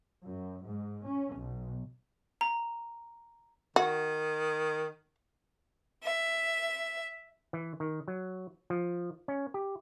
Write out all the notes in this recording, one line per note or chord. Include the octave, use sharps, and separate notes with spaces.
F#2
G#2
C#4
B1
A#5
D#3 F#4
E5
E3
D#3
F#3
F3
C#4
G4